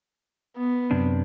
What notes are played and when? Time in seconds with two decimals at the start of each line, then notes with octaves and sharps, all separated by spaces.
0.57 B3
0.91 F#2 C3 D4